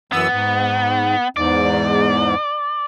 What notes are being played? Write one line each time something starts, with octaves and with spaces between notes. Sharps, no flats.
F#2 E3 B3 E6
G#2
E2 G#2 D5